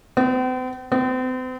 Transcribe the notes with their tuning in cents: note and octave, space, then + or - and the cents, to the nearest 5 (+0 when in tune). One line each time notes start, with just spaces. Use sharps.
C4 -45
C4 -40